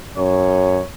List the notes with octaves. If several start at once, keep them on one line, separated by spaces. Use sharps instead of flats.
F#2 C#5